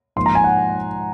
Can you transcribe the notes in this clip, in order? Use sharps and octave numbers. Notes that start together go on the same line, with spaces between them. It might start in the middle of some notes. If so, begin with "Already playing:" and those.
G#2 F3 A#3 C6
A#5
G#5
F#5